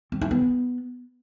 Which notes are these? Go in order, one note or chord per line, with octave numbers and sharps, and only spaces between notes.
C4
E4
B3